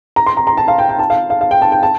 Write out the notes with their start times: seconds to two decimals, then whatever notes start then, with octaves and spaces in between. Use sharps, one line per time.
0.16 A#5
0.26 C6
0.37 A#5
0.47 A#5
0.57 A5
0.68 F5
0.78 G5
0.89 G5
0.99 A5
1.10 F5
1.30 F5
1.41 F5
1.51 G5
1.62 A5
1.72 G5
1.83 A5